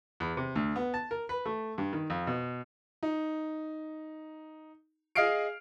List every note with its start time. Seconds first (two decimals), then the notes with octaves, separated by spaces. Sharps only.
0.20 E2
0.37 C3
0.55 D2
0.76 B3
0.94 A5
1.11 A#4
1.29 B4
1.46 A3
1.78 G2
1.93 D#3
2.10 F2
2.27 B2
3.03 D#4
5.15 G#4 D#5 F5 F6 C7 D7